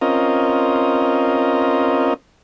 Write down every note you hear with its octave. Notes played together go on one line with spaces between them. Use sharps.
C4 C#4 F4 A#4 D#5